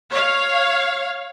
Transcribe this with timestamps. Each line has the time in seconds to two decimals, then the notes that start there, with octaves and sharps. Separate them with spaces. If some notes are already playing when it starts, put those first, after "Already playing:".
0.12 C#5 F5